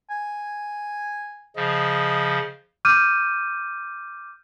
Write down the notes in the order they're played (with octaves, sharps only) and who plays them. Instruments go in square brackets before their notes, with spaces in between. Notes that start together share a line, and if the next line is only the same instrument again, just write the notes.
[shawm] G#5
[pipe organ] C#3 F3 [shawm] D#5
[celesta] D6 F6 G6 D#7